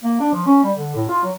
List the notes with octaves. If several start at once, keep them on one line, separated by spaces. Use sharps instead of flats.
A#3
D4
F3
C#4
G3
D3
A2
F4
F#3